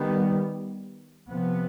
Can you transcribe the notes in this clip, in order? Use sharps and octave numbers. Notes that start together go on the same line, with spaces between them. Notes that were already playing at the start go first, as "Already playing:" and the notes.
Already playing: D#3 G3 B3
C3 F3 B3